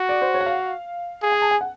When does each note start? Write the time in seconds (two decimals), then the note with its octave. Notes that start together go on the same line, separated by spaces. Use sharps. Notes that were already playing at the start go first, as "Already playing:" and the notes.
Already playing: F#4
0.09 D5
0.22 C5
0.34 C#5
0.41 F#5
0.46 F5
1.23 G#4
1.32 G#5
1.42 A5
1.51 G#5
1.61 F#5